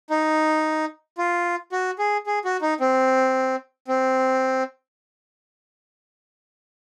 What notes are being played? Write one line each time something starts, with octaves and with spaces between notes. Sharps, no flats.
D#4
F4
F#4
G#4
G#4
F#4
D#4
C4
C4